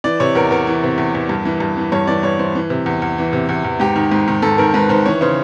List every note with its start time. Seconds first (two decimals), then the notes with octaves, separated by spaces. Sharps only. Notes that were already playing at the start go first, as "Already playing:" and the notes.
0.04 E3 D5
0.20 C3 C#5
0.35 E2 A#4
0.51 E2 A#4
0.67 E3
0.83 C3
0.98 E2
1.15 E2
1.29 G2
1.45 E3
1.60 G2
1.77 E3
1.92 G2 C#5
2.07 E3 D5
2.23 G2 C#5
2.39 E3 C5
2.55 E3
2.70 C3
2.86 E2
3.02 E2
3.18 E3
3.33 C3
3.49 E2
3.64 E2
3.80 G#2 G4
3.96 D#3
4.12 G#2
4.28 D#3
4.42 G#2 A4
4.58 D#3 A#4
4.74 G#2 B4
4.89 D#3 C5
5.06 E3 C#5
5.21 C#3 C5